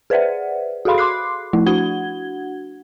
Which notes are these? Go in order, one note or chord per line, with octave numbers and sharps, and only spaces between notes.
G#4 B4 C5 D5 E5 F#5
F#4 G#4 A4 F5 B5 C6
C6 D6 F#6 C7
F3 A3 E4
D4 F#4 F#5 G#6 G7